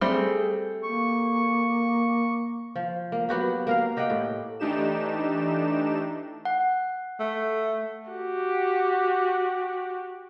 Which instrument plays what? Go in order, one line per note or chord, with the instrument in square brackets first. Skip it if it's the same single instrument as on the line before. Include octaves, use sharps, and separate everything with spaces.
[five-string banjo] G3 A3 C4 [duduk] G#4
[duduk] A#3 [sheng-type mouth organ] C#6
[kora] F3
A#3
F#3 B3 F#4 G4
A#3 A#4 F5
G4 D#5 F#5 G5
A2
[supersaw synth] E3 A3 D4 D#4 G4 E7
[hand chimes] F#5
[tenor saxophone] A3
[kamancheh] F#4 G4